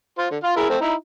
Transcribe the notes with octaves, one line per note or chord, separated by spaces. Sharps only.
F4 C5
D3
F4 F5
E4 G#4 A#4
A3 C4
D#4 E4